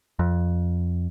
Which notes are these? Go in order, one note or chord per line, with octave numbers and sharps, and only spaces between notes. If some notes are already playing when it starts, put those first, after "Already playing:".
F2